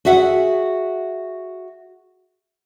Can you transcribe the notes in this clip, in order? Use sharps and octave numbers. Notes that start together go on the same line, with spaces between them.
F#4 G#4 E5 F#5